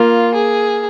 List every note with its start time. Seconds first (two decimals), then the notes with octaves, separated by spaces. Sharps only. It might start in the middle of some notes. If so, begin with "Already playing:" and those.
Already playing: A#3 F4
0.35 G#4